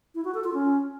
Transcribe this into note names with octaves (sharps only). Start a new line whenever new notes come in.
E4
F#4
A4
F4
C#4